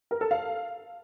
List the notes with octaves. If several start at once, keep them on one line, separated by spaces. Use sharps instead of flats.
A#4
A4
F5